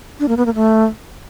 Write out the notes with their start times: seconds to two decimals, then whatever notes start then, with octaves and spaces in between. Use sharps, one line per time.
0.20 D4
0.28 A#3
0.37 B3
0.46 A#3
0.55 A3